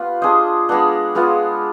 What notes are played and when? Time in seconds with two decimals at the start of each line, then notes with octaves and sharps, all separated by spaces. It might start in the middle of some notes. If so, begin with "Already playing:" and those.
Already playing: B3 F4 G4 B4 F5
0.22 D4 G#4 C5 D#5
0.69 G#3 B3 D4
1.15 G#3 B3 F4